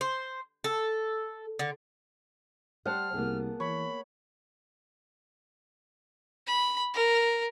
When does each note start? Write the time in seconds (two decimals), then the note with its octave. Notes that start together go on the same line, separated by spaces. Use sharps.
0.01 C5
0.64 A4
1.59 D3
2.86 G3 C5 F#5 A5 F6
3.14 C2 A#3 B3 G#4
3.60 E3 C#5 B5
6.47 B5
6.94 A#4